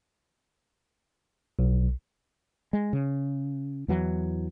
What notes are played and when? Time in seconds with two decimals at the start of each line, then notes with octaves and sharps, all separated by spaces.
1.59 B1
2.73 G#3
2.93 C#3
3.88 E2 E3 F#3